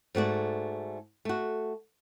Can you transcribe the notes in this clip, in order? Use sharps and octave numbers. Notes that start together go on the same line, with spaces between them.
G#2 A3 F#4 D5
A3 F#4